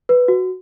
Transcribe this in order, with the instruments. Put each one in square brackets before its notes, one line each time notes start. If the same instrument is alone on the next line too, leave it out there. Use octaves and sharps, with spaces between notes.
[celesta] B4
F#4